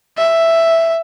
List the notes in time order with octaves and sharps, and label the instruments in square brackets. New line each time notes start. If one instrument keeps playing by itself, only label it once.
[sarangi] E5